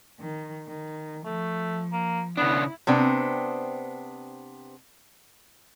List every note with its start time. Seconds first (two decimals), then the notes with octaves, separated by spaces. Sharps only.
0.20 D#3
0.68 D#3
1.25 F3 A3
1.92 A#3
2.37 C#3 B3 D4 E4
2.87 C3 B3 C4 D4